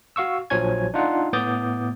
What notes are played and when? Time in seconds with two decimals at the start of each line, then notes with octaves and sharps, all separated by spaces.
0.16 F#4 F5 C#6 E6
0.50 A#1 F3 F#3 C#5 G#5 G#6
0.94 D4 D#4 F4 F#5
1.33 A2 B3 D6 D#6 G6 A6